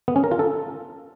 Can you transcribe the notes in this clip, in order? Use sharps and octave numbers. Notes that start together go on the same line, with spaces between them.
B3
C#4
A#4
F4
A4